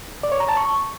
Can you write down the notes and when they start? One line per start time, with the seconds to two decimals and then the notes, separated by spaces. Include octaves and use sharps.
0.23 D5
0.32 C#5
0.40 A#5
0.49 A5
0.57 C#6